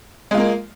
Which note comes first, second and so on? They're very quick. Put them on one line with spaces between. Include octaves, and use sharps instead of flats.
G#3 F4 A#3